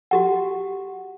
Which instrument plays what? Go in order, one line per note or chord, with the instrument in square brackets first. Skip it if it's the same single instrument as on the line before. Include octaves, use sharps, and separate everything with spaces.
[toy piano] F#4 G4 F#5